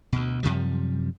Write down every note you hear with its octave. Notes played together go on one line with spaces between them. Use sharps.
D2 B2
F#2 C3 F3 G3